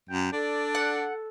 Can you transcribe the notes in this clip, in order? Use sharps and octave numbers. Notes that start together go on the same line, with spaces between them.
F#2 G5
D4 A4 D5
F#5